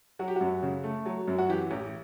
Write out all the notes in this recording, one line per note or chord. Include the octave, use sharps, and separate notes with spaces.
F#3 F#4
G4
F#2 F#4
C#3
A3
F#3
F#2
F#4
E3 G4
A1 G4